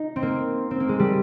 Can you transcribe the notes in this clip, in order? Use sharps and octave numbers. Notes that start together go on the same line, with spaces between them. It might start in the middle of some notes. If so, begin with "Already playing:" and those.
Already playing: D#4
C4
A#3
C4
A#3
G#3
G3